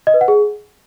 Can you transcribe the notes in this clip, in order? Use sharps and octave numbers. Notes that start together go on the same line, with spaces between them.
D#5
B4
F#5
G#4